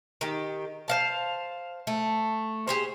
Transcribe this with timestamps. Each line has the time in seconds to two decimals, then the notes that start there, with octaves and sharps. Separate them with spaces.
0.21 D#3 G4
0.88 C5 F5 A5
1.87 A3
2.68 G4 G#4 C5